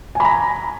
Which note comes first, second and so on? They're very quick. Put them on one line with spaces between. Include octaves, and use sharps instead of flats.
G#5 B5 A#5